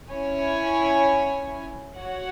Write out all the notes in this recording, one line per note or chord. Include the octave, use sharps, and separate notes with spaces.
C#4 E4 C#5 G#5
F#4 C#5 F#5